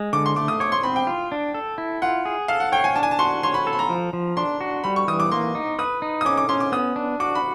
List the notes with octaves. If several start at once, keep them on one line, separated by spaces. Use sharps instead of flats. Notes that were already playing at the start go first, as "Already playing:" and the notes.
Already playing: G#3
D3 D6
C6
A3 D6
D#6
C#5 D6
C6
C4 B5
G5
F4
D4
A4
E4
F4 F#5
G#4
A4 F5
F#5
C#5 G5
G#5
D4 A5
G#5
A5
F#4 C6
C#5 C6
B5
A4
B5
A#5
F3
F3
D4 C6
F#4
G3 B5
C#6
E3 D#6
D6
A#3 C6
D#4
B4 D#6
D#4
D#6
C#4 D6
D6
C#4 C6
D6
B3 D#6
D4
F#4 D6
B5